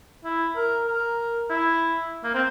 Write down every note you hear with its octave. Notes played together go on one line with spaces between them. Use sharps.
E4
A#4
A#4
E4
A#3
C4